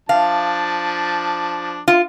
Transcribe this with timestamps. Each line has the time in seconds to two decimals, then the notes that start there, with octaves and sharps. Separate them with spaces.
0.09 F3 D4 F5 A5
1.88 F4